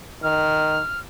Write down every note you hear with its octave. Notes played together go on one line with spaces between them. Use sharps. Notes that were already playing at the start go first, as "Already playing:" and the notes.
D#3 F6